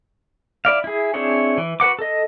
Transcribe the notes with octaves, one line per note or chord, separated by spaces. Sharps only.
E4 D5 F5
E4 G#4
C4 D4 E4 G#4 C#5
E3
F#4 B4 F#5 D6
A4 D#5